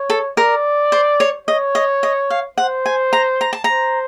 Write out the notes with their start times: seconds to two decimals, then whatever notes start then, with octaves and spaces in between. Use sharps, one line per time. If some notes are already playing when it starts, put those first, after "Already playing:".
Already playing: C#5
0.10 A4
0.37 A#4 D5
0.92 C5
1.20 C#5
1.47 C#5 D#5
1.75 D#5
2.03 D#5
2.30 F5
2.58 C5 F#5
2.86 G#5
3.13 A#5
3.41 A#5
3.53 A5
3.64 C5 A#5